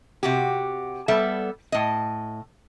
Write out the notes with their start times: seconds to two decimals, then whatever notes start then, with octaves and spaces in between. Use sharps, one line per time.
0.23 C3 F#4 G4
1.08 G3 B3 A4 E5
1.72 A2 D#5